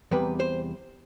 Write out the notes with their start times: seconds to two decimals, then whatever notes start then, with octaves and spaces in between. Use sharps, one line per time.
0.11 E2 C3 G3 B4
0.40 C5